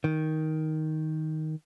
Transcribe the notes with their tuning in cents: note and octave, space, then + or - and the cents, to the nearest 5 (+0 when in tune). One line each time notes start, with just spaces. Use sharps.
D#3 +10